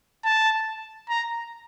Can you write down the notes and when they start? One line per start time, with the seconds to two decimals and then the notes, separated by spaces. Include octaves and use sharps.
0.25 A5
1.09 A#5